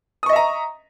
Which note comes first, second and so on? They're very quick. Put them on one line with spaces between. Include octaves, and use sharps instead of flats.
D#6 C#6 D#5 E5 A#5